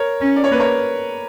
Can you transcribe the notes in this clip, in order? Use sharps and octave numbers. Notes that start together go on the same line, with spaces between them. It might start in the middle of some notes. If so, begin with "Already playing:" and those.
Already playing: A#4 C#5
C#4
D5
C#5
A#3 B4
A#4 C#5